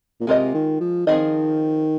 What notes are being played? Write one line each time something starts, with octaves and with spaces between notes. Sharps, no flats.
A#2
C3 G#3 F4 A#4 D#5
D#3
F3
D#3 F3 C4 F4 G#4 D#5